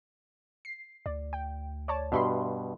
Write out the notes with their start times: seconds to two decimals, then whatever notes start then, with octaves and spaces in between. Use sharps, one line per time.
0.65 C7
1.06 D2 D5
1.33 G5
1.88 C#5 D5 A5
2.12 G2 B2 E5 B5 C6